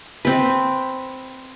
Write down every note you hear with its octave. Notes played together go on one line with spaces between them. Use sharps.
C4 B4